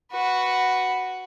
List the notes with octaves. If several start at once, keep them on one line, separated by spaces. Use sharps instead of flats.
F#4 B4